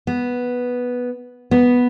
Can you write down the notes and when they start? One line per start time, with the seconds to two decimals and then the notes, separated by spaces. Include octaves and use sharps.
0.07 B3
1.51 B3